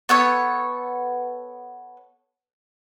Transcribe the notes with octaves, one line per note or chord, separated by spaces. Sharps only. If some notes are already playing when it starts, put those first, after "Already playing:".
B3 A4 C#5